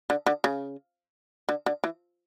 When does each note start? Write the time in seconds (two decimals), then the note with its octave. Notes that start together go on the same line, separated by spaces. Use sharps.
0.10 D3
0.26 D3
0.44 C#3
1.49 D3
1.66 D3
1.84 E3